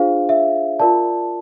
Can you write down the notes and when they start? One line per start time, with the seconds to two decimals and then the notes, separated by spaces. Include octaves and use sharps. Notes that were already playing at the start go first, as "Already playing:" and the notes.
Already playing: D4 F4 G#4 C5 F5
0.29 E5
0.79 F4 A#4 D5 A5